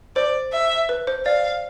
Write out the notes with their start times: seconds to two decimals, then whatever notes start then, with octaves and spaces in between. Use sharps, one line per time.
0.16 C5 D5
0.53 E5
0.89 B4
1.07 C5
1.25 D5 F5